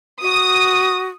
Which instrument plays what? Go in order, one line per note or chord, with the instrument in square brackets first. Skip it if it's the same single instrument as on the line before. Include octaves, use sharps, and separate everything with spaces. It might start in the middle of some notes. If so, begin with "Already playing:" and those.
[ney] F#4 [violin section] D#6